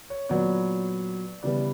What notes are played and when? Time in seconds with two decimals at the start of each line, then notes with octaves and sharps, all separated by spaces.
0.10 C#5
0.29 A#2 F#3 B3 D5
1.43 C#3 E3 G3 B3 D5